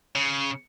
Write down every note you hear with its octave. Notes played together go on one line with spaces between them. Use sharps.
C#3